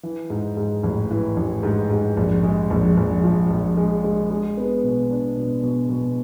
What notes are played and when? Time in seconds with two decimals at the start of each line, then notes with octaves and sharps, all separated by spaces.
0.03 E3
0.30 G#2
0.57 G#2
0.83 A1
1.11 E3
1.37 A1
1.63 G#2
1.90 G#2
2.17 A#1
2.43 G#3
2.70 A#1
2.97 A#1
3.24 F3
3.50 A#1
3.77 G#3
4.04 G#3
4.30 G#3
4.57 B3
4.84 B2
5.10 D4
5.37 B2
5.63 B2
5.90 B2